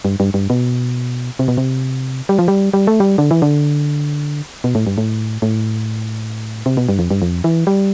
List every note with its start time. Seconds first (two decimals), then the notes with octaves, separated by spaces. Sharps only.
0.05 G2
0.20 G2
0.34 G2
0.50 B2
1.39 C3
1.48 B2
1.57 C3
2.29 G3
2.39 F3
2.48 G3
2.73 G3
2.87 A3
3.00 G3
3.18 D3
3.31 E3
3.42 D3
4.64 B2
4.75 A2
4.87 G2
4.98 A2
5.42 A2
6.66 C3
6.77 B2
6.89 G2
6.99 F2
7.11 G2
7.22 F2
7.44 E3
7.67 G3